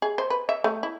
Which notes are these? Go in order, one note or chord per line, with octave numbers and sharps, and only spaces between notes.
G#4
C5
B4
E5
A3
E4